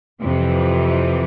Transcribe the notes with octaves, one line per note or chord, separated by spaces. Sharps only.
F2 C3 E3